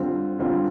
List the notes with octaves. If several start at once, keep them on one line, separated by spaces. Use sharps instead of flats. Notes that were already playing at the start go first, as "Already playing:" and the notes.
Already playing: D3 G3 C4 F4
D3 G3 C4 F4